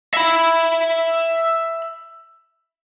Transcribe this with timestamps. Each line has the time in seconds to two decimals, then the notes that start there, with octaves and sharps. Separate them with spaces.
0.14 E5 B5